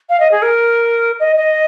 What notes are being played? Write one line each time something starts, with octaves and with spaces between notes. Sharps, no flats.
F5
D#5
G#4
A#4
D#5
D#5